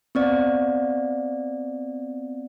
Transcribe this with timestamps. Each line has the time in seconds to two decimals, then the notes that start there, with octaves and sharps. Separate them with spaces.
0.15 B3 C4 D5